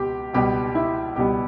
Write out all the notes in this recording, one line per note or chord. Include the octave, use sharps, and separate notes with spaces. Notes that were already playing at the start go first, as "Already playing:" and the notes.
Already playing: C#2 B2 B3 G4
C#2 B2 G3 B3 G4
E4
C#2 B2 G3 B3 G4